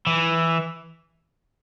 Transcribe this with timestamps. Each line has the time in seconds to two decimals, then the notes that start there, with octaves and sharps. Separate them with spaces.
0.07 E3